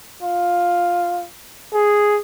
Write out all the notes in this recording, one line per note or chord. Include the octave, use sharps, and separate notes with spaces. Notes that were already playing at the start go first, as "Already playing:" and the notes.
F4
G#4